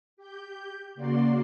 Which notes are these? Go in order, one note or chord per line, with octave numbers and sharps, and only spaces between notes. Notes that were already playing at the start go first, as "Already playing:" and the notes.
G4 G6
C#3 A#3 F#4 D5 C6